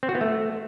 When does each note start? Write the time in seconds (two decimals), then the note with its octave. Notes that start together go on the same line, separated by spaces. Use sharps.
0.03 C4
0.09 F#4
0.15 B3
0.21 A3